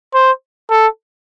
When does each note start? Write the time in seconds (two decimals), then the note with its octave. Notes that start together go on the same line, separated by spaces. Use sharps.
0.14 C5
0.70 A4